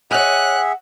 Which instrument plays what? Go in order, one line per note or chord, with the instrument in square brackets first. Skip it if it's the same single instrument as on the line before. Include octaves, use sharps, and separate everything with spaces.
[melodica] G#4 E5 [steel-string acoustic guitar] C#5 D#5 [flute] F#5 [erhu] F#6